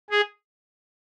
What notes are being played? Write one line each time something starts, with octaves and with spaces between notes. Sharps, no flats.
G#4